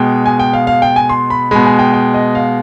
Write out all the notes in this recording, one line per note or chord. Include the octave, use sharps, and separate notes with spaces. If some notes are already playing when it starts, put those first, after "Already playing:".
Already playing: B2 G#3 G5
G#5
G5
F5
F5
G5
G#5
C6
B5
B2 G#3 B5
G#5
G5
G5
D#5
F5